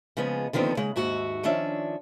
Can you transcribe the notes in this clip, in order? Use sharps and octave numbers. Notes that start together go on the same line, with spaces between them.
C#3 F3 G#3 B3
D3 D#3 F3 B3 C4
C#3 G#3
D#2 G#2 F#4 E5
D#3 F3 C#4 D4 E5